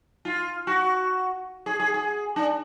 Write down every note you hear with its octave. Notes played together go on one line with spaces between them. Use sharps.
F4
F#4
G#4
G#4
G#4
D4